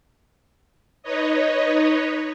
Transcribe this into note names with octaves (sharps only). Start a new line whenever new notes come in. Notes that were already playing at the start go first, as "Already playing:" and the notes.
D#4 B4 C#5 D#5